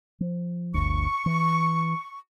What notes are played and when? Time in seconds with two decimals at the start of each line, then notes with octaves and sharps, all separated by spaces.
0.20 F3
0.74 G1 D2 C#6
1.26 E3